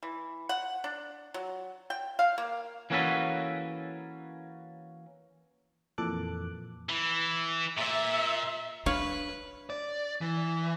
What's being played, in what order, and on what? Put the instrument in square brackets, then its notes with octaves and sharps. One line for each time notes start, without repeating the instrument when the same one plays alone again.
[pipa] E3
F#5
D4
F#3
G5
F5
A#3
[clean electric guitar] E3 A#3 C#4 F#4 A4 B4
[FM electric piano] F2 A#2 E3 A4 D6 F#6
[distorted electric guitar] E3
[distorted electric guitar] A#2 [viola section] E5
[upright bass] D4 [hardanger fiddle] B4 [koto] C#5 F5
[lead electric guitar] D5
E3